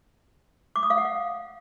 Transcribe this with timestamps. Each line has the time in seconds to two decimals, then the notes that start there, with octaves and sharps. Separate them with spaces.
0.76 D6
0.83 D#6
0.90 F5
0.98 F#5
1.05 F5